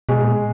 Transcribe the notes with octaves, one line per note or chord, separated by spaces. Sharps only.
B2 G#3
A#2